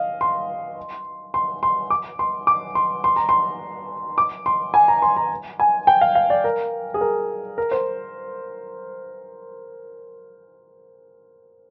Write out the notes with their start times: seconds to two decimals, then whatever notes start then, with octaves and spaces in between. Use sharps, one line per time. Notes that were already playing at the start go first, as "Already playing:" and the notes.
Already playing: D#5 F5
0.21 C6
1.34 C6
1.63 C6
1.90 D6
2.19 C6
2.47 D6
2.75 C6
3.04 C6
3.16 A#5
3.29 C6
4.18 D6
4.46 C6
4.74 G#5
4.88 A#5
5.02 C6
5.16 A#5
5.60 G#5
5.87 G5
6.01 F5
6.15 F5
6.30 D5
6.44 A#4
6.94 G#4
7.01 A#4
7.58 A#4
7.71 C5